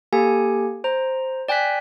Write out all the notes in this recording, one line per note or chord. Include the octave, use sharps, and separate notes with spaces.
A#3 G4 A4 G#5
C5 A#5
D5 G5 G#5 F#6 B6